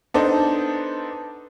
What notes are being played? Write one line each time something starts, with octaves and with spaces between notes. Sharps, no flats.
B3 D4 D#4 A4 C5